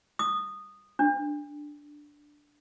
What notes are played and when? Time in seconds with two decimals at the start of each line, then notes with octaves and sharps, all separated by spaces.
0.19 D#6
0.99 D4